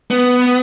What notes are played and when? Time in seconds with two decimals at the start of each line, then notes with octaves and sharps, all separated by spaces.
0.11 B3